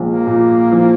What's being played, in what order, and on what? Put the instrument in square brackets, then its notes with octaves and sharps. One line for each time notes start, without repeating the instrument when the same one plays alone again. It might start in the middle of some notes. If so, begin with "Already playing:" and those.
Already playing: [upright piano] A#1 G#3
[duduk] A#3
[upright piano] A#2
F3